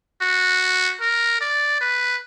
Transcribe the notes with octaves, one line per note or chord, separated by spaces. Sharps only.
F#4
A#4
D5
B4